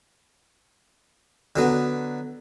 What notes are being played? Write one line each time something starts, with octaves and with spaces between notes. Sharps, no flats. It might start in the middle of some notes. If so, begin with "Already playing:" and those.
D3 F#3 B3